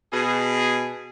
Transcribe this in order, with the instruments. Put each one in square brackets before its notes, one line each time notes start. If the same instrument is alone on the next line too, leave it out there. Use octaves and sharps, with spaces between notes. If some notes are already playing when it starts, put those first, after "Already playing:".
[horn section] B2 G#4